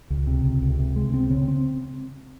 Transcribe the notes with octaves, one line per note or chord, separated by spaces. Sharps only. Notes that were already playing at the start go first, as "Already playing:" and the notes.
C#2
C3
C#2
C#2
C3
G#3
C4
C#3
C4